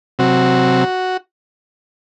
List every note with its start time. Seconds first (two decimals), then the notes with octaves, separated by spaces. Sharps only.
0.19 C3 F#3 C4 F#4